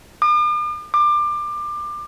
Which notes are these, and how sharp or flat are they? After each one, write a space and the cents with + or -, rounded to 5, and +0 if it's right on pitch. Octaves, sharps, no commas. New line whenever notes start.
D6 +45
D6 +25